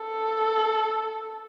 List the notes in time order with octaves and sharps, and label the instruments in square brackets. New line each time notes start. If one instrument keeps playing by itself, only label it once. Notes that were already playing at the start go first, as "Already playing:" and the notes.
Already playing: [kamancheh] A4